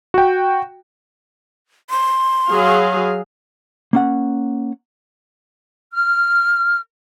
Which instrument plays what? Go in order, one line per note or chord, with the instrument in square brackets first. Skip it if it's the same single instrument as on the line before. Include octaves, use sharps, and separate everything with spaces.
[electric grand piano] F#4 G5
[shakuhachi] C6
[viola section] F#3 G#4 F5
[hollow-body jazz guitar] A#3 C#4 F#5
[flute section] F6